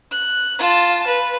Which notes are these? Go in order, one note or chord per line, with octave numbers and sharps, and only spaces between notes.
F#6
F4 A5
B4